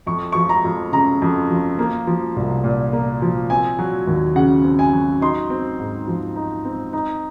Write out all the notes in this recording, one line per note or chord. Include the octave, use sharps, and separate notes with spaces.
F2 C#6
F3 C#6
A#5
F2
C#3 A#5
F2
F3
A#3
F3
C2
A#2
A#3
F3
C4 G#5
F#3
D#2
C#3 F#5
C4
G#5
F#3
D#4 C6
C4
G#2
F3
D#4
C4
D#4